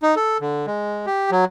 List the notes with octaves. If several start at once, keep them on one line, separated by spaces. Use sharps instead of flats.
D#4
A4
D3
G#3
G4
F#3